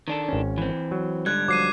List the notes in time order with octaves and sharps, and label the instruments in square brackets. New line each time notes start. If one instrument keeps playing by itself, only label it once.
[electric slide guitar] D#3 D4 A4
[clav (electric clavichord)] G#1 C#4
[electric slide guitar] E3 C4
[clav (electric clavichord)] F#3
[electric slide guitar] G#2 D3 G3 [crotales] F#6 G#6
[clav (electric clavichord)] F3 F#3 [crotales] D6 C7 D#7